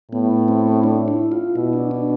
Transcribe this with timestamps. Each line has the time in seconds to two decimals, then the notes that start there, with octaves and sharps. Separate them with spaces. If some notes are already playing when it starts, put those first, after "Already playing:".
0.11 A2 B3
0.48 C4
0.84 D4
1.08 E4
1.32 F4
1.56 B2 E4
1.73 D4
1.91 D4